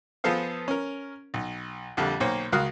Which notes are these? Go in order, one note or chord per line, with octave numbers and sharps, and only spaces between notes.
F3 B3 G#4 A4 C5 F5
C#4 A#4
B1
A#1 F2 D3 G3 F6
B1 A#3 C5 C#5
C#2 F#4 A#4 F5 D#6 F#6